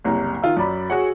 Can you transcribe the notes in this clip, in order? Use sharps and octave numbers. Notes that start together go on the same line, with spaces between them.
F#1 C2 A#5
D#3 F4 E6
F#2 D5 B5
F#4 G#4 C#5 F#5